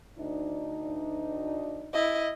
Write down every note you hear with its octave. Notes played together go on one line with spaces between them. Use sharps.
D2 D4 D#4
E4 D#5